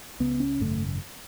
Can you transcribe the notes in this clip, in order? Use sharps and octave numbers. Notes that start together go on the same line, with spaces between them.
C#2 C#3 B3
C#4
G#1 F#2 C#3 A3